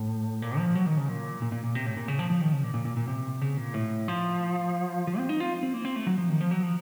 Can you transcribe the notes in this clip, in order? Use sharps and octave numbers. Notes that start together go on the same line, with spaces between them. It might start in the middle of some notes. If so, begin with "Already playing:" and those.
Already playing: A2
A#2
F3
F#3
D#3
C#3
A#2
A#2
A#2
A#2
C3
A2
A#2
C#3
F3
F3
D#3
C#3
A#2
A#2
A#2
A#2
C3
C#3
A#2
A2
F3
F3
C4
D#4
F4
C4
A#3
C4
A3
F#3
F3
D#3
F3
F#3
F3